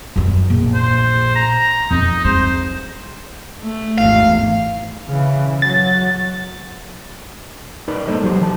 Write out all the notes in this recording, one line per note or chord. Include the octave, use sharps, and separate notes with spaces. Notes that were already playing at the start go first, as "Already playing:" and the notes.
F#2 D#3
A#1
C5
A#5
F2 D#4
G#3 C5
A3
G#1 E2 F5
C#3 E3
F#3 A6
D#4 A#4 B4 D5
G3 A#3 A4 C5 D#5
F#3 G4 C5
E3 A5